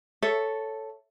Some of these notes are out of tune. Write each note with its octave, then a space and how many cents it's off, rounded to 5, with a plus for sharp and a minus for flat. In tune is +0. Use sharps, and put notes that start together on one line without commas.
A4 +0 C#5 +0 E5 +0